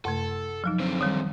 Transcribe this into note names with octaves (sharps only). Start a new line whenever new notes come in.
F#2 C3 A3 A4
F3 F#3 D#4
D3 C4
D#3 G3